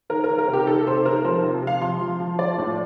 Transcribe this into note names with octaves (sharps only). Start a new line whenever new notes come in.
D#3 A#4
A#4
D#3
A#4
C3
G4
D#3 A4
C3 C5
D#3 A#4
F3 C5
C3
C3
F5
F3 C6
F3
F3
F3 D5
A2